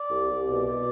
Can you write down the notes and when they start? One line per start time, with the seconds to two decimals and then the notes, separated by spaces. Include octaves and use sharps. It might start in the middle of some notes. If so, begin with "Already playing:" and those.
Already playing: D5
0.09 C2
0.28 C2
0.46 B2 D5
0.65 B2